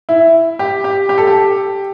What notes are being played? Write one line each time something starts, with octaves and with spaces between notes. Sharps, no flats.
E4
G4
G4
G4
A4
G4